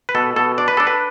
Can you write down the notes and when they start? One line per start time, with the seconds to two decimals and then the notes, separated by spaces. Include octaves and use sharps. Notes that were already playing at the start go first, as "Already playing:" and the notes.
0.09 B4
0.15 B2 A4
0.36 B2 A4
0.58 D4 D5
0.68 B4
0.77 D4 A4
0.87 B4